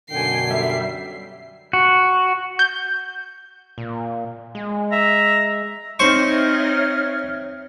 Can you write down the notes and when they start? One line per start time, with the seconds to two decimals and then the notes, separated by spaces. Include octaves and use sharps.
0.11 F#2 B2 D3 G5 G#5 C7
0.51 G3 E5
1.73 F#4
2.59 G6
3.78 A#2
4.55 G#3
4.92 E5 A#5
6.00 C4 D#4 C5 C#5 E5 C#6 F6